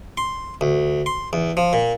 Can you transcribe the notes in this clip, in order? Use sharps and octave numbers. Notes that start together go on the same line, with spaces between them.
C6
D2
C6
E2
F3
A#2